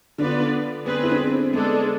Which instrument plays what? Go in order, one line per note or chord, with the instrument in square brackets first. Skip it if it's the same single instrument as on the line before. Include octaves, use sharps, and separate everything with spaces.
[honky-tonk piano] D3 D4 [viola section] B3 F4 B4 D5
[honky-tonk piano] B3 [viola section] C4 G#4 B4
[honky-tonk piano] E4
D4
C4
[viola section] G#3 D4 A4 [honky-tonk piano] B3